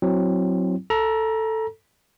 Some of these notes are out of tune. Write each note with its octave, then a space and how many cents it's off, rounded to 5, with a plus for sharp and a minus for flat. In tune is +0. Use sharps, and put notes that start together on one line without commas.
F#3 +0 C4 +0 E4 +0
A4 +5 A#5 +30